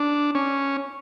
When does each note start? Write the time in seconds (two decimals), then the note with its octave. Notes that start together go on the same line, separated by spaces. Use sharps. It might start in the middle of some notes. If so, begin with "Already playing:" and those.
Already playing: D4
0.35 C#4